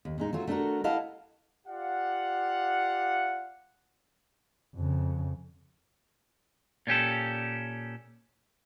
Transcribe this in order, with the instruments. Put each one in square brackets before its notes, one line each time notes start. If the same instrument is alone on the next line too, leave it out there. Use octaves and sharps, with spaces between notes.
[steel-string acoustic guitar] D#2
A#2 G#3 D#4
F#3 A3 F4 F#4
A3 B3 D4 E4 F#4 A#4
E4 D#5 F5 F#5 A5
[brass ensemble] F4 G4 D5 F5 F#5
[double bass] F2 C#3
[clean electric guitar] A#2 C#4 G4 A4